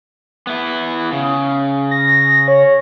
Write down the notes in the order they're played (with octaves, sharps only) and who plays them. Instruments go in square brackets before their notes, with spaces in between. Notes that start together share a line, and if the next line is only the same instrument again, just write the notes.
[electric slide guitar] B3 E4
C#3
[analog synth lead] A#6
C#5